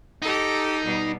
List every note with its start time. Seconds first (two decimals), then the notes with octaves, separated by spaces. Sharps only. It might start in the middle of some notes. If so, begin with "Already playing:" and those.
0.22 D#4 G4 A4
0.85 B2 G3